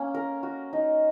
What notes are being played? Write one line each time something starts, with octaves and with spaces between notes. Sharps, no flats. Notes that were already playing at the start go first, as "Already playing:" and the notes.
Already playing: A#3 C#4
A#4
F#4
D#4